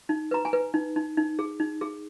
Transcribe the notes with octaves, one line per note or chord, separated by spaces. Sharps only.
D#4
B4 A#5
G#5
B4
D#4
D#4
D#4
G#4
D#4
G#4